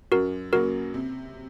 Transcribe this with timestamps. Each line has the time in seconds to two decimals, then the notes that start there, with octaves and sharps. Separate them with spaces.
0.12 F#2 F#4 A#4
0.53 C#3 F#3 A#3 F#4 A#4
0.94 C3